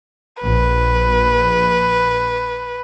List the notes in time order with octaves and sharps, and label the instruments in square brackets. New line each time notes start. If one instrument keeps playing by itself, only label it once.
[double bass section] A#1 [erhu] B4